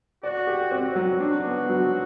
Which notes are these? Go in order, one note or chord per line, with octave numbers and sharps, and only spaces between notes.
F#4 D5
G4
C4 F#4
F#3
D4
B3
F#3